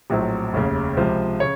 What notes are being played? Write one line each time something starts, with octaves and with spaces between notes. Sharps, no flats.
A#1 A2 F#3 C4
F1 D#2 C#3
C#2 C3 F3
C#3 C#5